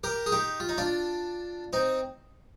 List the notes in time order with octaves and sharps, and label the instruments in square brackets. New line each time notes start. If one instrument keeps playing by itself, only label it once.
[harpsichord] G4 A#4
G#4
D#4 G4
F4
D#4
D4 F4
C4 D#4